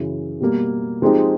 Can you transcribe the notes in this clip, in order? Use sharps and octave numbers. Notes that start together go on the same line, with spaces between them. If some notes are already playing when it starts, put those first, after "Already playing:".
Already playing: F#2 C#3 E3
B2 G3 A#3
F3 G#3 C4 D#4 G4